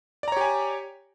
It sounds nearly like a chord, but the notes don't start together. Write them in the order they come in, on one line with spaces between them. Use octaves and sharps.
D5 A#5 C#5 G4 G#5